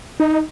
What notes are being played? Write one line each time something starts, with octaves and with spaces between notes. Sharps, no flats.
D#4